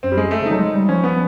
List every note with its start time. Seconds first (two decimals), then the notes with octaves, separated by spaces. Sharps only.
0.03 F#2 C4
0.12 G3
0.17 G#3
0.31 A3
0.40 C#3
0.46 F#3 D#4
0.60 G#3
0.74 G3
0.89 F3 C#4
1.04 B3